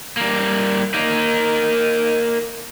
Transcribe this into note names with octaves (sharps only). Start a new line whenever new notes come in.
G3 A#3
A#3 D#4